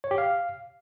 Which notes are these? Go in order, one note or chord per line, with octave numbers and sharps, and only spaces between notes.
C#5
G4
F5